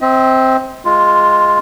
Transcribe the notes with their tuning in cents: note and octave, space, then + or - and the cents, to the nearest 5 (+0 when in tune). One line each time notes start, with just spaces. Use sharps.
C4 +0 D#5 +45
G#3 -5 F4 +0